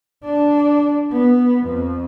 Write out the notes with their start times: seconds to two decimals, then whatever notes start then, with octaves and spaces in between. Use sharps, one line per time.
0.25 D4
1.12 B3
1.65 F2